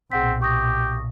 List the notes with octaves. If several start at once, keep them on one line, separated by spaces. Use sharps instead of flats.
B1 A#2 C4 G#4 F#5 B6
G4 C#6 D#6 A#6